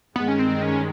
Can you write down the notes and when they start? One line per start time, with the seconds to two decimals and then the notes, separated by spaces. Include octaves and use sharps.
0.16 G2 D#3 G#3 B3
0.28 C#4
0.39 C4
0.62 C#4